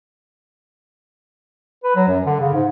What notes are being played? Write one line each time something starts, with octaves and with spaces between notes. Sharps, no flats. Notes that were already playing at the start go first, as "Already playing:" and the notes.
B4
F#3
F#2
D3
C#3
G#2